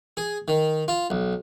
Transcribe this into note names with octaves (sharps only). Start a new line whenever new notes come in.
G#4
D#3
F4
B1